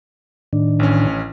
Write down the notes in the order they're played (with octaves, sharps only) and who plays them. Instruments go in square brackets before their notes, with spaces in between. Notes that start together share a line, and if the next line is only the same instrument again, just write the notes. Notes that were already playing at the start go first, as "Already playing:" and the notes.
[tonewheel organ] A2 D#3 D4
[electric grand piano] A1 C#4